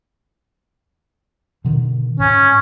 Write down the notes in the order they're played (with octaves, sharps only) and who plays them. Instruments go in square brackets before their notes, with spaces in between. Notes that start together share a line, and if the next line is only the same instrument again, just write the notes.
[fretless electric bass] B2 D3 D#3
[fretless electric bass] G#2 [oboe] C#4